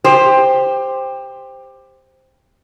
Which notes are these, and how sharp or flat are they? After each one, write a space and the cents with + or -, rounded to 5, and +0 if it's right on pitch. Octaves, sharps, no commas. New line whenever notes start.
G4 +15 C5 +0